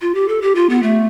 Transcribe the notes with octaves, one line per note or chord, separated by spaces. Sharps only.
F4
G4
A4
G4
F4
B3
A3